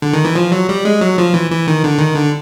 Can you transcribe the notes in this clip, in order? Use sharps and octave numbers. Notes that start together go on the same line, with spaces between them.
D3
D#3
E3
F3
F#3
G3
G#3
F#3
F3
E3
E3
D#3
D3
D#3
D3